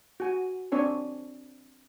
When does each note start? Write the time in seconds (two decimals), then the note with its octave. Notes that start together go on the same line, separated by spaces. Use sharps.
0.20 F#4 G#5
0.72 C4 D4 C#5 G#5